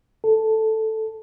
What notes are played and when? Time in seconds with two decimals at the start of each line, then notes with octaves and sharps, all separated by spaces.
0.24 A4